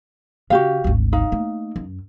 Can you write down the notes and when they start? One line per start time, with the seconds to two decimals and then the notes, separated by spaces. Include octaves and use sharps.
0.50 C#3 F#4 G4 F5
0.84 G#1 D2
1.13 D#4 F5
1.32 A3 A#3
1.76 F#2